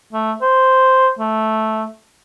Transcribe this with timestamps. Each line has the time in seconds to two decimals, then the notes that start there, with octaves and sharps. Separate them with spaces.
0.13 A3
0.41 C5
1.18 A3